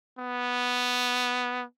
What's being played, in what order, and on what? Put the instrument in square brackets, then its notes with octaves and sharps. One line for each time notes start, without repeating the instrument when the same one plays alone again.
[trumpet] B3